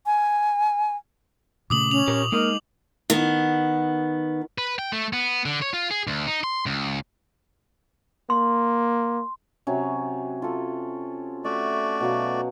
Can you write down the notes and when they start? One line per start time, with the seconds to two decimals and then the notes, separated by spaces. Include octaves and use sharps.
0.06 G#5
1.70 A#2 C#3 A3 D6 D#6 F#7
1.91 C#4 F7
2.08 A#2 G4 A#4 C#5
2.32 G#3 A#3 D#4 A#4 D#5
3.10 D#3 B3
4.58 B4
4.79 G5
4.93 A3
5.13 B3
5.45 D3
5.62 C#5
5.74 F4
5.91 G#4
6.07 D2
6.27 D#4
6.44 C6
6.66 C#2
8.30 A#3 C6
9.67 C3 F#3 C#4
10.42 F4 A4
11.44 A3 F#4 D5 E5
12.00 B2 F#3 F5